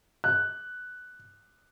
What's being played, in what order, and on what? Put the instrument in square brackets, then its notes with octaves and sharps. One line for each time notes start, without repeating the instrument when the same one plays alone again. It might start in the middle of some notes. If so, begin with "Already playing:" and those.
[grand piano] F#6